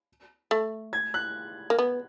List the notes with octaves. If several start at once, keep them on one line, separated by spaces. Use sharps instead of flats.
A3
G#6
F#6
A#3
B3